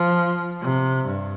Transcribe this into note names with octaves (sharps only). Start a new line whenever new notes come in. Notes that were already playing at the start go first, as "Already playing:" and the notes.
Already playing: F3
C3
G2